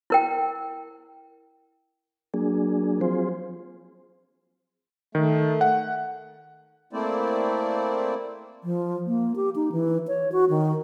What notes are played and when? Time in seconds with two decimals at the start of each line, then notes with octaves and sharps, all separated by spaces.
0.10 E4 A#4 G5
2.34 F#3 A#3 D4 G#4
3.01 F3 F#3 C4 F4 G#4 C5
5.15 D#3 A3
5.61 F#5
6.93 A3 A#3 C4 E4 C5 D5
8.64 F3
9.07 A#3
9.36 G4
9.56 D#4
9.72 E3
10.08 C#5
10.32 F#4
10.49 D#3